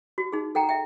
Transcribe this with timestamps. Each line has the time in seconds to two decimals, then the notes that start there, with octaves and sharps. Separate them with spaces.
0.18 F#4
0.32 D#4 G#4
0.55 A4 F#5 G5 A#5
0.69 E5 G5